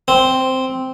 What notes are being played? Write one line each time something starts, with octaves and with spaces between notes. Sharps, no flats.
C4